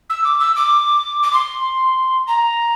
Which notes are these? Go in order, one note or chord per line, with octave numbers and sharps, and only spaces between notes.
E6
D6
E6
D6
D6
C6
A#5